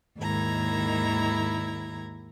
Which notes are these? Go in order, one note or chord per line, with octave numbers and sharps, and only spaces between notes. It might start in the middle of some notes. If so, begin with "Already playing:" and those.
D#2 G#2 D#3 E4 A#5 G#6